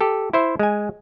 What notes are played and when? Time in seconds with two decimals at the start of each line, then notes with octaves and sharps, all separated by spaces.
0.01 G4 A4
0.33 E4 C5 E5
0.59 G#3 G#5